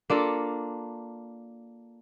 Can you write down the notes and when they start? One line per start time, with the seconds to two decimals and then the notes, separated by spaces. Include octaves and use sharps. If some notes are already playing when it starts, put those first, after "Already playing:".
0.10 A#3 D4 F4 A4